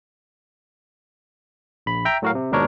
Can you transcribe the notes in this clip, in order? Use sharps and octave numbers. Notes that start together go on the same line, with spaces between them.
A#1 B5
E5 G5 A#5
A2 F#3 F#4 A#4 F5
C3
D#2 G#2 B2 D4 A#4 C#5